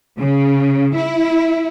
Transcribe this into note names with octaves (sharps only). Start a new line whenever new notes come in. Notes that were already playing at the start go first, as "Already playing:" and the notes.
C#3
E4